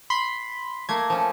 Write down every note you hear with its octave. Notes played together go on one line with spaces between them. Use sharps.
B5 C6
A3 A#3 G#6
F3 C#4